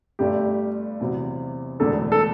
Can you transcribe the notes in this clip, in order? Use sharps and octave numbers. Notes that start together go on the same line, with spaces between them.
G1 G2 D3 A3 G4
E2 C3 F#3
E1 E2 D3 A3 A4
A4